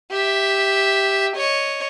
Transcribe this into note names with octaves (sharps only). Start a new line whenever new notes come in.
G4 E5
C#5 D#5